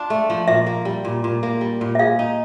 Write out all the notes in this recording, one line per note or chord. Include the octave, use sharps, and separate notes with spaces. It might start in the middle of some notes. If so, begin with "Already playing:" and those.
Already playing: D4 F4
A3
F3
A#2 E5
A#3
G3
A#2
A#2
A#3
G3
A#2
E5
G#4 F5
D#4